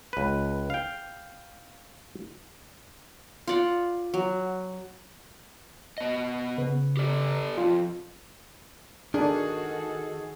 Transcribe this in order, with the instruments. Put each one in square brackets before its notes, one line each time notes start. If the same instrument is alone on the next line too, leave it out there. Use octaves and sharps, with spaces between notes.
[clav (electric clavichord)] C#2 B4
F5 G5
[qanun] F4 D5 F#5
F#3
[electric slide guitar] B3 D#5
[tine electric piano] C#3 B4
[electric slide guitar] G4 A4 D5
[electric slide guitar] F2 [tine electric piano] F4
[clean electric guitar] D#3 [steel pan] D4 [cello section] F#4 A4 [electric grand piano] G#4